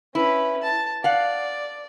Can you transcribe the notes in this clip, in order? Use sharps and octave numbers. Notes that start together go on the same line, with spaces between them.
C#4 E4 B4
A5
D5 F5 F#5